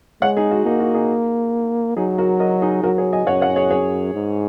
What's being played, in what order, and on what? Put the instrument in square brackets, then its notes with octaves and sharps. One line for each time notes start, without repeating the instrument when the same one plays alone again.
[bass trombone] G#3 [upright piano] C#5 F#5
[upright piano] D#4 G#4
F#4
[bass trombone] A#3 [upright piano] D#4
[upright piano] F#4
D#4 G#4
[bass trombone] F#3 [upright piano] D#4 G#4
[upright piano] F#4 A#4
A#4 D#5
D#4 G#4
[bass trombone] F#3 [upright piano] F#4 A#4
[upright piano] G#4 C#5
D#5 G#5
[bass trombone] F#2 [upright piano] C#5 F#5
[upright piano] C#5 F#5
G#4 C#5
G#4 C#5
[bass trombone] G#2